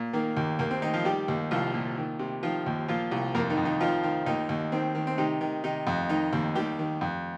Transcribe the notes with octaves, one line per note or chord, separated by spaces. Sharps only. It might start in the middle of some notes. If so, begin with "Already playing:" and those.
Already playing: A#2
D#3 A#3
D#2
D#2 A#3
C4
D#3 D#4
F3 F4
D#3 G3 G4
D#2
C2 F3 F4
A#2
D#3
C3
D#3 F3 F4
D#2
A#2 F3 F4
C2
F2 A#3 A#4
D#3 D#4
F2
D#3 D#4
D#3 F3 F4
D#3
D#2 D#3 D#4
D#2
D#3 C4
D#3
C4
C3 D#3 D#4
D#3
C3 D#3 D#4
F2
D#3 D#4
D#2
D#3 G3 G4
D#3
F2